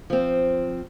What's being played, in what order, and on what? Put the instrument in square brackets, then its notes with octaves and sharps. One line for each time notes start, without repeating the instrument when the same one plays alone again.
[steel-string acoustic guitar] F3 C4